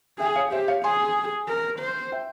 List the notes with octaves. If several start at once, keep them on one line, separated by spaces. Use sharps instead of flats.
G#4 E5 G5
C#5 F5
G4 C5 E5
C#5 F5
G#4 G#5 C6
A#4
C5
E5 G5